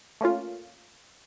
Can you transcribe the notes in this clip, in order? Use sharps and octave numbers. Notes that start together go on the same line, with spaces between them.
A3 A#3 C#4 F4